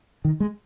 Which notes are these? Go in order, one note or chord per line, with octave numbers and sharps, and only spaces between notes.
D#3
G#3